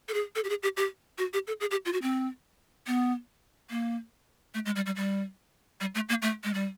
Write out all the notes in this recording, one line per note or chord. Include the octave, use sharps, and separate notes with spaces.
A4
G#4
A4
G4
G#4
G4
G4
F#4
G4
A4
G#4
G4
F4
F#4
C4
B3
A#3
A3
G#3
G3
G3
G3
G3
A3
A#3
A3
G#3
G3